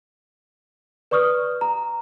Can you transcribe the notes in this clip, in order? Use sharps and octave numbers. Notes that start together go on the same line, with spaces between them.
B4 D5 C#6 D#6 F6
A#5